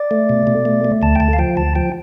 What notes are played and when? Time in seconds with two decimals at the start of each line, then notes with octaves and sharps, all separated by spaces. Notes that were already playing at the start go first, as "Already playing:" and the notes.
Already playing: D5
0.11 A3
0.29 B2
0.47 B2
0.65 A3
0.85 A3
1.02 D2 A5
1.15 G5
1.20 D2 A5
1.33 F5
1.38 F3 G5
1.57 D2 A5
1.75 F3 G5